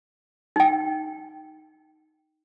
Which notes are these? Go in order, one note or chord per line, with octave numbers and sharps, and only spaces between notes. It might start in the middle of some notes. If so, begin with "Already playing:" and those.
D#4 G5